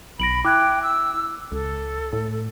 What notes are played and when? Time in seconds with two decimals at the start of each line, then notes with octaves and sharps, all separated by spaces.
0.20 B1 B5 A#6 D7 F#7
0.45 E4 G5 D6 F#6 G#6
0.83 E6
1.52 C#2 A4
2.13 A2